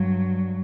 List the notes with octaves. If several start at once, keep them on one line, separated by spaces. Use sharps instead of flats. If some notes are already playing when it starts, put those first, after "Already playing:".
Already playing: G2 F#3